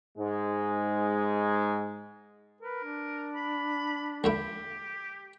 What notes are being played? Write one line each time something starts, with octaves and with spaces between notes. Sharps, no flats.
G#2 G#3
A#4 B4
D4
B5
C#2 D3 E4 G4